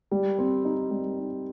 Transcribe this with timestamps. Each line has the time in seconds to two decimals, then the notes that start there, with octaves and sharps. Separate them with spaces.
0.11 G3
0.39 C4
0.65 D#4
0.91 G3
1.19 D#4